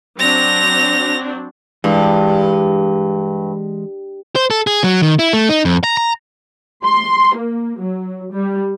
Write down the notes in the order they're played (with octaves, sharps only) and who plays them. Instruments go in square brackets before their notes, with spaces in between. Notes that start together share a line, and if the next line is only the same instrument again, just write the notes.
[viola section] F#3 C4 D4 [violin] A#6 F7
[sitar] G2 [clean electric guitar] E3 G#3
[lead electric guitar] C5
A4
G#4
F#3
D#3
E4
A3
D#4
F2
A#5
A#5
[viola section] C6
A#3
F#3
G3